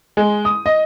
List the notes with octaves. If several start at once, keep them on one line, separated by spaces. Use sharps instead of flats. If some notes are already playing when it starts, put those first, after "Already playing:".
G#3
D#6
D#5